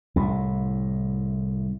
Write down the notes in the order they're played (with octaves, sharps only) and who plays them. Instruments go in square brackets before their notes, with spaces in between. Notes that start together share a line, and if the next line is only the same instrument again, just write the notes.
[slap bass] C2 A2